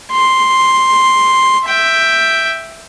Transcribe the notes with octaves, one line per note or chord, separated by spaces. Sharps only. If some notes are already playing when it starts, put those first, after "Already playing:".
C6
E5 G5